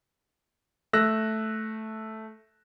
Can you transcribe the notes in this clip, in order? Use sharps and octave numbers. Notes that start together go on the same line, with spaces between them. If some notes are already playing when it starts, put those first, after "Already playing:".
A3 E6 F#6 A#6